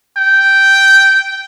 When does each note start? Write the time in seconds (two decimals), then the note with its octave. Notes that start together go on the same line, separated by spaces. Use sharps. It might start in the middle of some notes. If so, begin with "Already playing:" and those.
0.18 G5